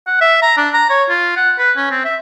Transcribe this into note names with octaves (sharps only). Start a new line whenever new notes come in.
F#5
E5
A#5
D4
A#5
C#5
F4
F#5
B4
C#4
C4
E5